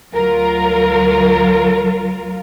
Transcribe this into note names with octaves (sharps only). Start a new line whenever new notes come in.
D2 F#3 F4 A#4